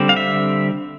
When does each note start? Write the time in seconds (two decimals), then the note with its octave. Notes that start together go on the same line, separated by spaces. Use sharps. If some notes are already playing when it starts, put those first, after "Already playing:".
Already playing: D3 G3 C4
0.09 F5
0.17 E5